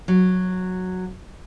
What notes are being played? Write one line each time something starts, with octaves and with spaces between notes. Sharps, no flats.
F#3